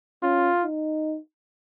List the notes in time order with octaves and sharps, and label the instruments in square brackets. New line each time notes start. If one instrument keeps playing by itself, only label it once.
[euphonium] C#4 [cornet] F4
[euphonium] D#4